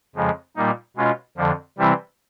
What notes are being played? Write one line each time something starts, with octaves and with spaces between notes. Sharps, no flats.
F2 C#3 F3 G#3
A#2 G3 A#3 D#4
B2 G#3 C#4 F4
F2 D3 F3
C3 E3 G3 C4 E4